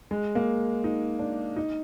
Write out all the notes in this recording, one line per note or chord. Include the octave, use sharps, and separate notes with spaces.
G#3
A#3
D#4
D4
D#4